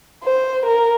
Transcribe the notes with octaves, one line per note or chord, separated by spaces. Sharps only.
C5
A#4